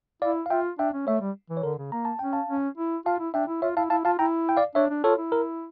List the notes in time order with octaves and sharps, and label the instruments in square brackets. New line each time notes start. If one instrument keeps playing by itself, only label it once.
[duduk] E4 [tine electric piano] D5 F5
[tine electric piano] F5
[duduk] F4 [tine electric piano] E5 G5
[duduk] D4 [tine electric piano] E5 G5
[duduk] C#4
[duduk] A3 [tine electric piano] C#5 E5
[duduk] G3
E3
[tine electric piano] C#5
[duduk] D3 [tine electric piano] A#4
[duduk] C#3
[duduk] A#3 [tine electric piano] A#5
[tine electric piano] A5
[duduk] C#4 [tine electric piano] G5
[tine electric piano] F5 A5
[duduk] C#4
E4
[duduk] F4 [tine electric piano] F5 A5
[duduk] E4
[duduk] D4 [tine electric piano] E5 G5
[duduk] E4
[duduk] F4 [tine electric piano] C#5 E5
[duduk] E4 [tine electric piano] F5 A5
[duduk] E4 [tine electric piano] F5 A5
[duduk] F4 [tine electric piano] F5 A5
[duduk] E4 [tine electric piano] G5 A#5
[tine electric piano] G5
D5 F5
[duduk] D4 [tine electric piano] C#5 E5
[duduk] D4
[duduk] F4 [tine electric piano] A4 C#5
[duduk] E4
[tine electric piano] A#4